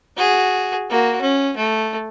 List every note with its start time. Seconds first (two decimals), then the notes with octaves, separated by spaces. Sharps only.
0.17 F#4 G#4
0.90 A#3 F#4
1.21 C#4
1.57 A3